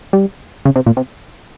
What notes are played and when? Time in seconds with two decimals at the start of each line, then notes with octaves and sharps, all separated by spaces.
0.13 G3
0.65 C#3
0.76 C3
0.86 A#2
0.97 C3